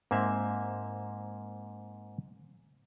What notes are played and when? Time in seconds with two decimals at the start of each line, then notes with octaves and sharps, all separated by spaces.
0.11 G#2 A#3 C4 E5